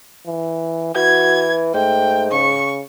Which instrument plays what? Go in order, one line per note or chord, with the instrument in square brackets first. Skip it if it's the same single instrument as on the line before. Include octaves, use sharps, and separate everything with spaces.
[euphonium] E3
[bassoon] E3 [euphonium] F#4 [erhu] G#6
[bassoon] G#2 [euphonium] A3 [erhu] G5
[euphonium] C#3 [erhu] C#6